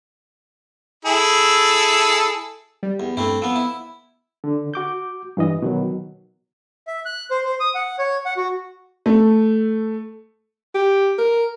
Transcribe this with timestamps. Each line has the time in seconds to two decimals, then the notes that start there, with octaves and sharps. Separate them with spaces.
1.05 E4 G#4 A4
2.83 G3
3.00 E2
3.17 G2 A3 C4 E4
3.42 F3 B3 E6
3.56 E4
4.44 D3
4.74 F#4 D6 G6
5.37 G2 E3 D#5
5.62 B2 D#3 F#3
6.87 E5
7.05 F#6
7.31 C5
7.45 C5
7.60 D#6
7.75 F#5
7.99 C#5
8.25 F#5
8.37 F#4
9.06 A3
10.74 G4
11.18 A#4